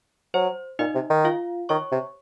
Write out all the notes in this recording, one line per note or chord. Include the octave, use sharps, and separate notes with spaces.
F#3 C5
A#2 D#4 D#5
C3
D#3
F4 F5
D#3 C#5 C#6
C3